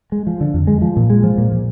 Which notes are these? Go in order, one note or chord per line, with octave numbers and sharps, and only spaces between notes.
G#3
F3
D3
F2
G#3
F3
A#2
G#3
F3
A#2
A#2